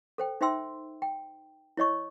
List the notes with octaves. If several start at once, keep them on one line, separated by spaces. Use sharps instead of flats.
A4 C5 G5
D#4 C5 E5 G5 C6 E6
G5
E4 C#5 D#5 C#6